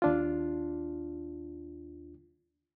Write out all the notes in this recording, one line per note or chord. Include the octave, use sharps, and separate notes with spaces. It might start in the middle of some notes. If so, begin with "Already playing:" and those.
D#2 D4 F4